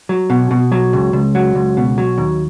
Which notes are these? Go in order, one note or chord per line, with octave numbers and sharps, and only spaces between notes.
F#3
B2
B2
F#3
C#2
C#2
F#3
C#2
B2
F#3
D#2